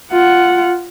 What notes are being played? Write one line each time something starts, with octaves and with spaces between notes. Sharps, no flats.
F4 F#5